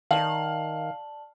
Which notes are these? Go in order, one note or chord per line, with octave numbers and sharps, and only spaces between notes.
D#3 D5 F5 A5 F#7